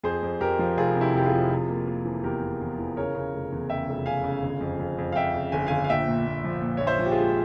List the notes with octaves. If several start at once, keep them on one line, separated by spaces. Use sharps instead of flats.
F2 G#4 C5
F2
F2 G4 A#4
F3
F1 F4 G#4
C3
E4 G4
F1 G4
F4 G#4
F3
C3
A#3
A#3
E3
E2 G4 A#4
A#3
E2
E3
C#3 A#4 C#5
C#3
F1
E2
C#3 E5 G5
F1
C#3 F5 G#5
C#3
G1
F2
F2
F2
F5
F2 E5 G5
C#3
G1 G#5
G1 F5 G#5
F5
A#1 E5 G5
A#2
A#2
F3
A#2
A#1 C#5
C5 E5
F3
G4
F4 G#4
G#3